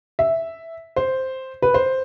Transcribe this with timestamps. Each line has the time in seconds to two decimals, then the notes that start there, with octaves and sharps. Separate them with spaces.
0.19 E5
0.96 C5
1.62 B4
1.74 C5